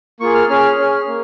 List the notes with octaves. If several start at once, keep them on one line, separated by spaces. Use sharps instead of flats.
A#3 F4 G#4 C#6
F6
C#4 G#4 F6
C#4 G#4
A#3